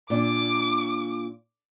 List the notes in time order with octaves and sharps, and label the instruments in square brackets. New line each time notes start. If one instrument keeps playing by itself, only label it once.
[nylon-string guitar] A#2 D4 [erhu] D6